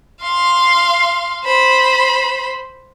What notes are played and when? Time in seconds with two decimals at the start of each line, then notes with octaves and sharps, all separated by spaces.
0.23 F5 C6
1.44 C5 B5